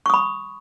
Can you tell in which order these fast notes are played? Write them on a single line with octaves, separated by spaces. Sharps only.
C#6 D#6 B5